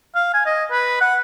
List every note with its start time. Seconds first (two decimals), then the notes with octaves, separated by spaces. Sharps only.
0.15 F5
0.34 G#5
0.46 D#5
0.71 B4
1.01 F#5